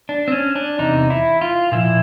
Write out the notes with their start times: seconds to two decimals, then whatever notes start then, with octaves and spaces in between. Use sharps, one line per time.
0.09 D4
0.28 C4
0.32 C#4
0.56 D4
0.79 E2 C3 D#4
1.10 E4
1.41 F4
1.72 A#2 F3 E4